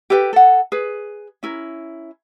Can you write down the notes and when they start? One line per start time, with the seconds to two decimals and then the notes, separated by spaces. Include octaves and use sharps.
0.10 G4 A4 B4 G5
0.33 A4 F#5
0.72 G#4 B4
1.43 C#4 E4 A#4